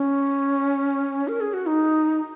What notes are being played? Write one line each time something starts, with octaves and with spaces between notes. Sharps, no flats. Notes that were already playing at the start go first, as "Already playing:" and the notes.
Already playing: C#4
A#4
G#4
F#4
D#4